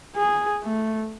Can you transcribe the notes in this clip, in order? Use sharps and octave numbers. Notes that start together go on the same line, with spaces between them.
G#4
A3